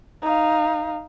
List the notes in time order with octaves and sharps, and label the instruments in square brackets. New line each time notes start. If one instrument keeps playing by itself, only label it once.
[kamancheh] D#4 F5